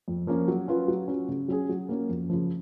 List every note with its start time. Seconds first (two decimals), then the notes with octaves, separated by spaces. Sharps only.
0.08 F2
0.27 F3 A#3 C#4
0.48 F#3
0.68 C#4 F4 B4
0.88 F#3
1.08 C#4 F#4
1.29 C#3
1.48 F#3 C#4 G#4
1.69 F#3
1.89 A#3 C#4
2.09 F2
2.30 C#3 F3